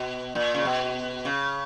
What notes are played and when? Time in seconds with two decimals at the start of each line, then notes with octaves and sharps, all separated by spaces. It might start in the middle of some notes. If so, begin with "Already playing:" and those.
Already playing: B2
0.35 A#2
0.54 C#3
0.65 B2
1.25 C#3